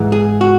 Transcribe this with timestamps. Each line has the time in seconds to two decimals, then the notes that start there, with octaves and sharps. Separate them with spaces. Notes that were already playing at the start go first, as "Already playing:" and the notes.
Already playing: G#2 E3
0.12 G#4
0.41 F#4